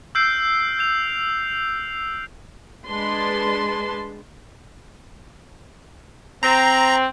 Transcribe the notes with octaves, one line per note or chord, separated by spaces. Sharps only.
E6 F6 G6 C7 D7
G6 F7
G#3 D4 B4 A5 C6
C4 A#5